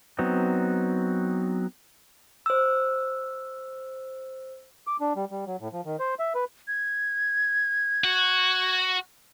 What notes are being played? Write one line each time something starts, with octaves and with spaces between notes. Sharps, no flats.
F#3 B3 C4 D#4
C5 E6
D6
D4
G3
G3
F#3
A2
F3
D#3
C5
E5
B4
G#6
F#4